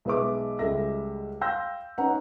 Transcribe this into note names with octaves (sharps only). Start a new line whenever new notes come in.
B1 G#3 B4 E5 D6
C#2 G3 G#3 A4 E5 A#6
F5 G5 C6 E6 G6 A#6
C#4 D#4 B4 F#5 A#5